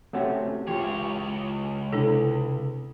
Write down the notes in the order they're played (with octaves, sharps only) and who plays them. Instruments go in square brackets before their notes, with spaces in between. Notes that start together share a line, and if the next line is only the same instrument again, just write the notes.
[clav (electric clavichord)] A3 C#4 F#4 [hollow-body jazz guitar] C4 G4 E5
[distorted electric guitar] C#2 C#5 [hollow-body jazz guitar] E3 F4 [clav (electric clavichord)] G4
[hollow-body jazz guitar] C3 [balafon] D4 E4 A4